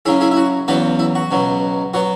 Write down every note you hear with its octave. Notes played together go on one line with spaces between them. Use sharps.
F#2 C#3 F#3 C#4 E4 G#4
E4 G#4
E4
F#4
E2 C#3 F#3 B3 F#4 B4
E4
F#4
C#2 B2 F#3
F#3 B3 F#4